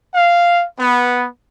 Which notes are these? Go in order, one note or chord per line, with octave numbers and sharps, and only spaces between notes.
F5
B3